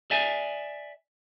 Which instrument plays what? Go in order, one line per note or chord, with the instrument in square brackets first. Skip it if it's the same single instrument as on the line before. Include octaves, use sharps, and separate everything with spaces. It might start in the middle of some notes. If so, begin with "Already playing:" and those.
[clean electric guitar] D5 E5 G#5